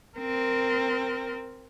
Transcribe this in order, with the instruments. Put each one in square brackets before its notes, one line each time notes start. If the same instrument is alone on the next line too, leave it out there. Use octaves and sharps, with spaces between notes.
[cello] C4 A#4